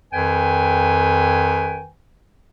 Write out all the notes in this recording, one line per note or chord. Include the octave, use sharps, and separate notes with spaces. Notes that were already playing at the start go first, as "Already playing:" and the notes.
F2 D#3 B4 G5 G#5